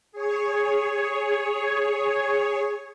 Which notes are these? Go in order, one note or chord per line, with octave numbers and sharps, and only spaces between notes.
G#4 C#5